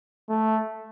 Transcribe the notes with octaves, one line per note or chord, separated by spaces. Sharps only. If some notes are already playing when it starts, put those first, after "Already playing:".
A3